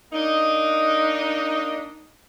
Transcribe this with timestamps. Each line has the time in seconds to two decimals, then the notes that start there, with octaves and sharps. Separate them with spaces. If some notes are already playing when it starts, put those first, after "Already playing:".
0.12 A#3 D4 D#4